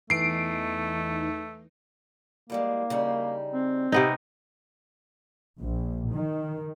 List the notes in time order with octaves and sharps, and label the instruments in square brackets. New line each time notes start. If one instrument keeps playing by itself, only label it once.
[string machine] E2 D#4 [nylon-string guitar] E3 [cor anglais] A3 [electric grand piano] C7 D7
[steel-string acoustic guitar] E3 G3 G#3 [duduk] A#3
[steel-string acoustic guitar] C#3 G3 D#4
[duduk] C4
[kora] C3 B3 D#4
[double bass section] A#1
D#3